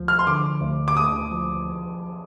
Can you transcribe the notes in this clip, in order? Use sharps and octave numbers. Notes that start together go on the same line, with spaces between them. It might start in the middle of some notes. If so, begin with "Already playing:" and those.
Already playing: D2 F3
F6
C6
D3 D6
D2
D6
D2 D#6
F3